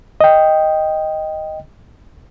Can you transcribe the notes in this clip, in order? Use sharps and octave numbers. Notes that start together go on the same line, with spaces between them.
D#5 G5